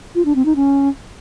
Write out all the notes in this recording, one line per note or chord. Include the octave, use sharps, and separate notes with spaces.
F4
D4
C4
D#4
C#4